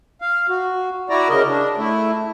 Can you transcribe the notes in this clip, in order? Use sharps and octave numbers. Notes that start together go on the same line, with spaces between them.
F5
F#4
E4 F#4 D5 A#5
C#3 A#4 D#5
D4
A3 E4